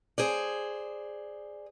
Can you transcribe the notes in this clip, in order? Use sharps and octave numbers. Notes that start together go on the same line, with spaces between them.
G#4 C5 D5